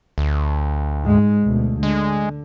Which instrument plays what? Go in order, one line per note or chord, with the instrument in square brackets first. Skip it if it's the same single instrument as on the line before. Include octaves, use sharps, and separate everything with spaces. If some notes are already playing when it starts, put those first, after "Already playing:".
[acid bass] D2
[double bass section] G#2 G#3
D2 B2
[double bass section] D3 [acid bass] G#3